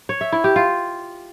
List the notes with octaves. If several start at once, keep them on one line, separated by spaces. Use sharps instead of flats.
C#5
E5
E4
G4
F4